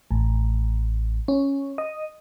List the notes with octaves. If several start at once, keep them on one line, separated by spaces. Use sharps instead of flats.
A1
C#4
D#5